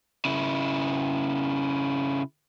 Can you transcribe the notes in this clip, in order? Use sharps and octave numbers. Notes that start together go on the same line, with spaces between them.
C#3 E4